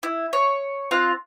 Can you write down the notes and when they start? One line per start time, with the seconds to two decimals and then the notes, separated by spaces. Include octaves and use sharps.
0.03 E4
0.33 C#5
0.91 C4 F4 F5 F#6